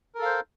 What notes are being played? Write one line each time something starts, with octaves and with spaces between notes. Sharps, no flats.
A4 A#4 C5 F5